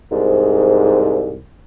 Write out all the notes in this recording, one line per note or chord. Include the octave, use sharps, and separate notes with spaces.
C2 G#2